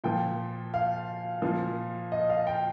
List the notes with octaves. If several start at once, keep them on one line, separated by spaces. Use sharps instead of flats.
A#2 F3 G5
F5
A#2 F3
D#5
F5
G5